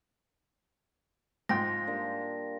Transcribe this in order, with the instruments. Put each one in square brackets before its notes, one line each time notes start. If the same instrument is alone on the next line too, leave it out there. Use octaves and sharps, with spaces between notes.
[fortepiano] G#2 G5 C6 [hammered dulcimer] F3 F4 [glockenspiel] A#6
[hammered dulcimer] G3 A#3 D4